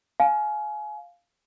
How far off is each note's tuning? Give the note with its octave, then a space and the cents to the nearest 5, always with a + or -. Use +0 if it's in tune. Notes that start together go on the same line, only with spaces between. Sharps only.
F5 +0 G#5 +30